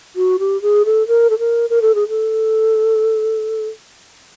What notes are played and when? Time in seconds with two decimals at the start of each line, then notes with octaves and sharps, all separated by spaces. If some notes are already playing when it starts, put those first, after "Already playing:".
0.16 F#4
0.39 G4
0.62 G#4
0.86 A4
1.08 A#4
1.30 A4
1.39 A#4
1.70 A#4
1.82 A4
1.95 G#4
2.09 A4